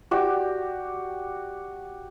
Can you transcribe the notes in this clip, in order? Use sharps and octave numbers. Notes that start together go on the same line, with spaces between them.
F#4 G4 D5